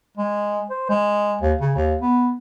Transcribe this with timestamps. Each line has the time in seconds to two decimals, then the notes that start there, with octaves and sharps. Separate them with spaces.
0.17 G#3
0.70 C5
0.89 G#3
1.41 D#2
1.61 C#3
1.76 D#2
2.01 B3